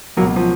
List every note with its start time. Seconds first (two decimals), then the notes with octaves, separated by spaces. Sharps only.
0.17 C#2 F#3 A#3
0.21 B2
0.27 F#3
0.36 F3